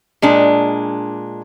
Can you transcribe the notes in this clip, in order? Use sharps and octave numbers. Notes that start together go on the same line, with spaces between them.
A#2 G#3 D4